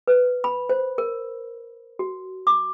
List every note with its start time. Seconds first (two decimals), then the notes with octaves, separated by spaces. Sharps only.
0.07 B4
0.44 B5
0.69 C5
0.98 A#4
1.99 F#4
2.47 D6